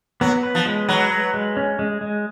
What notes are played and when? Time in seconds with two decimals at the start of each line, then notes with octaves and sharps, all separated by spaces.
0.21 F#3 B3
0.43 B4
0.55 F3
0.66 G#3
0.89 F#3 B4
1.11 B4
1.34 G#3
1.57 C#4
1.79 G#3
2.01 G#3